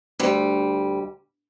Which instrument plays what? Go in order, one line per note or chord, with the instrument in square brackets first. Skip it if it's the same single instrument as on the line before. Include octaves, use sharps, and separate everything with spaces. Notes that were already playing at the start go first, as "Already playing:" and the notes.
[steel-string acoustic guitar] D2 G3